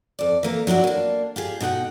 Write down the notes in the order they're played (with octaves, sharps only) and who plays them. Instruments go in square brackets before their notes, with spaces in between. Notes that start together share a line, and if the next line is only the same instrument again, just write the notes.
[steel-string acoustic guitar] F2 D5
E3 A#3 A#4
F#3 D4 E4 F#4
A#3 D4
F4 G4 G#4
B2 D#4 A4 F#5 G5